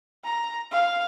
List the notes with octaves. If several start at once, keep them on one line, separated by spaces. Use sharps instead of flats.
A#5
F5